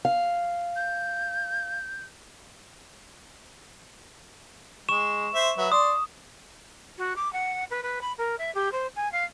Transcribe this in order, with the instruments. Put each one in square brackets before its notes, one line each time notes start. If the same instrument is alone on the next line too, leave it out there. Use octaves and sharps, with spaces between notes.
[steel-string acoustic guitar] F5
[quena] G6
[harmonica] G#3 [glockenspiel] C#6 E7
[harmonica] C5 E5
F#3 B4 E5
[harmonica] D5 C6 [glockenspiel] D#6
[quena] F#4
D6
F#5
B4
B4
B5
A#4
E5
G4
C5
G#5
F5